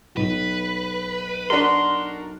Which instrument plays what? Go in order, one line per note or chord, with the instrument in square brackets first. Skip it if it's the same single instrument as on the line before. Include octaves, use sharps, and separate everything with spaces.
[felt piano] B1 [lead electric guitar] B4
[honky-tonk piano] D4 F#4 A#4 [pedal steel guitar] C6